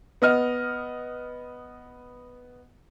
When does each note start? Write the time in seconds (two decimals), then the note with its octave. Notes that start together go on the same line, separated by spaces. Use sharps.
0.22 B3 D#5 F6